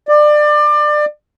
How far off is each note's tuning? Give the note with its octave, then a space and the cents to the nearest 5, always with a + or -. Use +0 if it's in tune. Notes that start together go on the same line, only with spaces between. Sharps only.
D5 +25